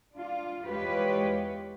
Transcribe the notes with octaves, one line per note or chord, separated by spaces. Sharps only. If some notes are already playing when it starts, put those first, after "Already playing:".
D4 F4
E2 G#3 F4 G4 B4 C#5